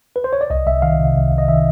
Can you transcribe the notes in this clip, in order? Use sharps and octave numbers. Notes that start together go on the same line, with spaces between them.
B4
C5
C#5
D5
C2 D#5
C2 E5
D#3 F5
C3
C2
C2
D#5
D#3 E5